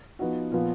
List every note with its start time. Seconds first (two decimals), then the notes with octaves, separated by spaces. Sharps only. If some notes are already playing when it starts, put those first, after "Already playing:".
0.19 F3 B3 D#4 F#4
0.52 A#2 F3 B3